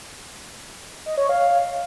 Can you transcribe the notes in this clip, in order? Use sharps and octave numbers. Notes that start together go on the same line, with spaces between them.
D#5
C#5
F5